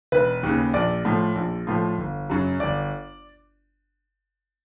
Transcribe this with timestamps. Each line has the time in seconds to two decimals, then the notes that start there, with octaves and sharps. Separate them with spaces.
0.12 E1 B4
0.43 D#2 C#3
0.74 A#1 D5
1.05 A2 F3
1.36 A#1
1.67 A2 F3
1.98 G1
2.30 F#2 C#3 F#3
2.60 G1 D5